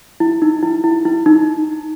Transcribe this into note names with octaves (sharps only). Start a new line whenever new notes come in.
E4
D#4
E4
E4
E4
D#4